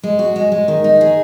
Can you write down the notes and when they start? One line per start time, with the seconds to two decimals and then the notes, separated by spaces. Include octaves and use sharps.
0.03 G#3
0.19 F#4
0.36 G#3
0.52 G#3
0.68 D#3
0.84 D#4
1.01 G#4